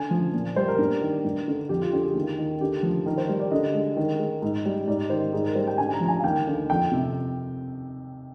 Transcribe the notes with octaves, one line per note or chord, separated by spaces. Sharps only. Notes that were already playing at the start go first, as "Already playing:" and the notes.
Already playing: D3 G#5
F3
A#2
G3 C5
A#4
G2
D#3
G2
D3
F2 G4
F4
D3 G4
G#4
D#2
D#3
D3 G4
F3
D#3 A#4
C5
G3
D5
D3 D#5
G#3
D#3
G#3
G#2
G3
G#2 D5
D#3 C5
G#2 G#4
A#4
G3 C5
G5
D3 G#5
A#5
F3
G#5
F5
D#2 G5
D3
F2 G5
C3